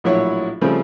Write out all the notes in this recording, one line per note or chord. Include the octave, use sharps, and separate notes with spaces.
A#1 A2 F#3 E4 C#5 C#6
C#3 F3 G3 A3 C4